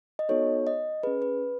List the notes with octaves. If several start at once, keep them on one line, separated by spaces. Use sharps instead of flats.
D#5
B3 D#4 F#4 A4 C#5
D#5
C#4 G#4 B4
B4